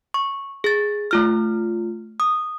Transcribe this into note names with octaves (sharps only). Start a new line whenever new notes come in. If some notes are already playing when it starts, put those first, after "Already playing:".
C#6
G#4 A6
A3 F4 F6
D#6